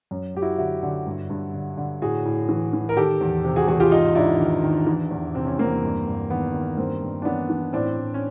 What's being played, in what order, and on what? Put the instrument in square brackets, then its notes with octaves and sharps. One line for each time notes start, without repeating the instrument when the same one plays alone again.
[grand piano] F#2
F#2 G4
E4 F#4
D3 E4 F#4
D3
G2
G2
D3
D3
A2 F#4 G#4
A2
E3
E3
A#4
D#3 G4 A4
E2
C3
F#4 G#4
E2 F#4 G#4
F4 G4
G#2 D#4 F4
G#2 D4 E4
D#3
D#3
E3
E2
C3 C4
C#4
E2 A#3 C4
G2
G2
D#3 B3
D#3
G2 A#3 C4
G2
D4
E3 B3 C#4
E3
A2 C4 D4
A2
C#4